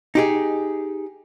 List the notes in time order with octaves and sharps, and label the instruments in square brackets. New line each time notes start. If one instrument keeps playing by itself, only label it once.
[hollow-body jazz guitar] D#4 G4 G#4